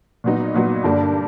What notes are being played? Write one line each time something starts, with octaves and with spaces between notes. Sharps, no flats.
A#2 F#3 B3 D#4
A#2 F#3 B3 D#4
G2 D3 G3 A#3 D4